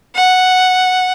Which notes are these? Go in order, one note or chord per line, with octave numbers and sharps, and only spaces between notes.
F#5